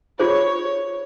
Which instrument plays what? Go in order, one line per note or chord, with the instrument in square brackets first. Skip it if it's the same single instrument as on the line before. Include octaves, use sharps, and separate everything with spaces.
[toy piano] F4 G#4 C5 [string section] C#5